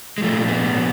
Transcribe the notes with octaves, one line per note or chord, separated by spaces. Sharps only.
G#3
A#2 F3 A3
B3
A#2